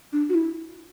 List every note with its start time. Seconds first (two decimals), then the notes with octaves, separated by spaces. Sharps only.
0.13 D4
0.29 F#4
0.35 E4